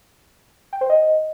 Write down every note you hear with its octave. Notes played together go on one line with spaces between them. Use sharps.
G5
C5
D#5